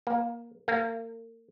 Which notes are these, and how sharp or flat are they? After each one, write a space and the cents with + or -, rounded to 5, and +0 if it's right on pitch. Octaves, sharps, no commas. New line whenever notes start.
A#3 +15
A#3 -35